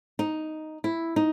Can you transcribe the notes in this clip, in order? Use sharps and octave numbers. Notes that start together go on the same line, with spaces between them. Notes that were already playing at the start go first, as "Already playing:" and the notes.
D#4
E4
D#4